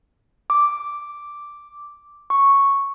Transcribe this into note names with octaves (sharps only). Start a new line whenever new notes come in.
D6
C#6